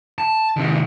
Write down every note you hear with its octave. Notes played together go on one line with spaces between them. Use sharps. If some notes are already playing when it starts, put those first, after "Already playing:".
A5
C3 D#3